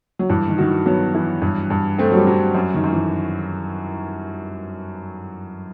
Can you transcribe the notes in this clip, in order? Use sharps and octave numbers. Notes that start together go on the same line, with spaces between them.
F#3
G2 E3
D#3
D#3 F#4
E3
F#3 B3
E3
G2
G2
A3 C4
F#3
G3
F#3
F#2
D#3
F#2
E3